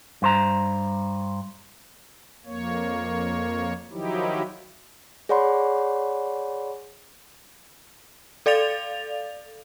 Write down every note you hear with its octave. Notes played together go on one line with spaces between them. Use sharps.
G2 C5 A#5
F2 A#3 C#5
D#3 F3 F#3 D#4 E4 G4
G#4 C#5 D5 F#5 B5 C6
A4 D5 F5 A6 F7